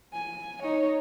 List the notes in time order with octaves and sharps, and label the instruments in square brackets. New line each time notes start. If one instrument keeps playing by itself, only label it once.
[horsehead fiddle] G#5
D#4 C#5